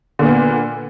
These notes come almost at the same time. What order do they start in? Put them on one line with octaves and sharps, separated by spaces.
D3 A#2 B3